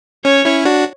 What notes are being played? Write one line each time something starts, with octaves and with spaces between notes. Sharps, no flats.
C#4 C#5
C#4 E4
D4 F#4